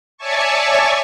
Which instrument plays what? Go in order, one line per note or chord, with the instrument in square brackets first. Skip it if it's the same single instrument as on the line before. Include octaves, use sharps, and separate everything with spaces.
[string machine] C#5 D5 E5 G#5 A5 C#6